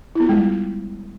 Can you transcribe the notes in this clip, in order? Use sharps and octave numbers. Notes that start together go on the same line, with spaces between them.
G3 G#3 B3 E4 F4